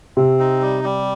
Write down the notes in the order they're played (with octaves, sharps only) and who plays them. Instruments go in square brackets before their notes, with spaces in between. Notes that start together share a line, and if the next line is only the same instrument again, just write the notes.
[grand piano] C3 [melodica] C4
[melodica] D#4
G3
G3